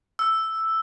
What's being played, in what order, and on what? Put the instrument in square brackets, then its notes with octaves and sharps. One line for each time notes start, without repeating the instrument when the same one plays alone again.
[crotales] E6